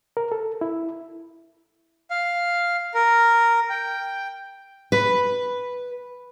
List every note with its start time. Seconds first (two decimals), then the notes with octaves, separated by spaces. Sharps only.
0.17 A#4
0.32 A4
0.61 E4
2.11 F5
2.94 A#4
3.69 G5
4.92 B4